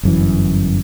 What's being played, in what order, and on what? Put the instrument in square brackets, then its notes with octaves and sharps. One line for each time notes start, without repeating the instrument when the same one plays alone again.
[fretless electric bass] G1 F#2 E3